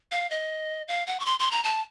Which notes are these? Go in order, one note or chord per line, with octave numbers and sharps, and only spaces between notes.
F5
D#5
F5
F#5
C#6
C6
C6
A#5
A5